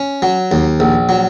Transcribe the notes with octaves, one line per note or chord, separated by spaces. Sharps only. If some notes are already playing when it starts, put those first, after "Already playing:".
Already playing: C#4
F#3
D#2
A#1
F#3